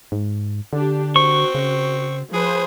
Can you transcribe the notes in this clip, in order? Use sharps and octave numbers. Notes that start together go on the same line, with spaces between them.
G#2
D3 D4 G4
C4 F#4 C#6
C#3
F3 G#4 B4 C5